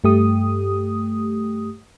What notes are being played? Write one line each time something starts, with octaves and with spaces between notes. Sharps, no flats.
G2 A3 G4 D#6